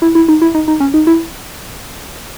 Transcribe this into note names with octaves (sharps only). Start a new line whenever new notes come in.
E4
E4
D#4
E4
D#4
D#4
C#4
D#4
E4